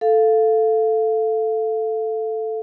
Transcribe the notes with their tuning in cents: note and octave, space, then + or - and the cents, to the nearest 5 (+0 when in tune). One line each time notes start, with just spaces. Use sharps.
A4 +0 F5 -5